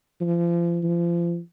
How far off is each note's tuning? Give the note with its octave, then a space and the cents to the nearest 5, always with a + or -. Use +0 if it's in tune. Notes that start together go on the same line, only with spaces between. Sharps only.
F3 -35
F3 -30